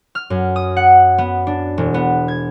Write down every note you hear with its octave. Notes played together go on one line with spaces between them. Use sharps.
F6
F#2
D#6
F#5
B3
D4
E1
B3
G#6